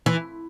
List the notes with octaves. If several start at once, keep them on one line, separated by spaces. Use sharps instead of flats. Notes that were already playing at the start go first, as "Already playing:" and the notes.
E3